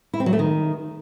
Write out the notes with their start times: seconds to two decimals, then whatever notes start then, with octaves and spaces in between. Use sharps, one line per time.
0.13 E4
0.20 C4
0.26 F#3
0.33 A3
0.39 D#3